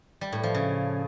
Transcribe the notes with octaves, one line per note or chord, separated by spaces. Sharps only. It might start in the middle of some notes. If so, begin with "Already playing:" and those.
G3
A2
F3
C#3